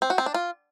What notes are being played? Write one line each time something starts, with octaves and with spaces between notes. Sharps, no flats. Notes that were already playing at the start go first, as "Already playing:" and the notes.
C4
F#4
C4
D4
F4